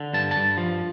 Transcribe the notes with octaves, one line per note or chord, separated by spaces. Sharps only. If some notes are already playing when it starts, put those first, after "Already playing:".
Already playing: D3
G2 A5
A5
G2
F3